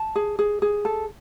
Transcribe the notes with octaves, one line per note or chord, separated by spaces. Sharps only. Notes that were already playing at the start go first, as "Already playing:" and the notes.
Already playing: A5
G#4
G#4
G#4
A4